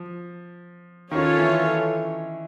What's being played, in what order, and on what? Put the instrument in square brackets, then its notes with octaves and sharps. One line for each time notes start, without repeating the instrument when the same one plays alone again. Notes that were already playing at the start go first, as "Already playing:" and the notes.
Already playing: [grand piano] F3
[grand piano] D#3 [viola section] C#4 F4 A4 C#5
[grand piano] E3